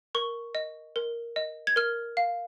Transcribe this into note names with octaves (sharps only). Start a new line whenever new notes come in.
A#4 C#6
D#5
A#4
D#5
G#6
A#4 F6
F5